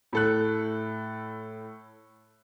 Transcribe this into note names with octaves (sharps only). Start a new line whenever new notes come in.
A2 A4 F#6